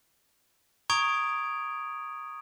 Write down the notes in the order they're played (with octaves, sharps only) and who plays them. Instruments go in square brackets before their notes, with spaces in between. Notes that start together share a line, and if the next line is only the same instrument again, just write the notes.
[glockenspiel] A#5 C#6 D#6 G#6 D7 F7